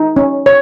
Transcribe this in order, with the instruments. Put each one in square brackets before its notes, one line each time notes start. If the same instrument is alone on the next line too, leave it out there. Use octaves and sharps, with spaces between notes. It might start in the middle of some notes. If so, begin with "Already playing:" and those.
Already playing: [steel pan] D#4
C#4
C#5